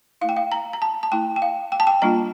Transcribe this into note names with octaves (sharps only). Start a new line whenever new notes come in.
A3 E4 F5
G5
F5
A#5
A#5
A5
A5
A3 E4 G5
G5
F5
G5
A5
G5
G3 A#3 D4 F4 A#5